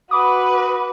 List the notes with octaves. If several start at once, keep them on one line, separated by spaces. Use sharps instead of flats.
F#4 B4 B5 D6 D#6